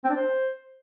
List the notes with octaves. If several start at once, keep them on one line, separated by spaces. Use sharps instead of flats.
C4
D4
C5